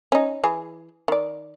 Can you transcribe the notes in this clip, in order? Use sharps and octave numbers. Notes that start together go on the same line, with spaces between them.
C#4 D#4
E3 G#4
D#3 D5